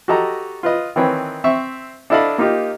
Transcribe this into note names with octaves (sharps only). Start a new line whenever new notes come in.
F#4 G4 A4 D#5 A#5
F4 B4 D#5
D#3 E3 C4 B4 C#5
C4 E5 C#6
D4 E4 A4 D#5 F5 B5
A#3 D#4 F4 G4